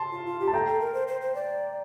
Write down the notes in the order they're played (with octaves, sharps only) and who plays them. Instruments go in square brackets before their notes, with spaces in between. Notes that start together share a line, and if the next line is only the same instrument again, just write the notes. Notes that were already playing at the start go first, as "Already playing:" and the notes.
Already playing: [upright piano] A5 C6
[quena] F4
F4
G4
[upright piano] A5
[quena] A4 [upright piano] G5 A#5
[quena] A4
A#4
C5
C5
C5
D5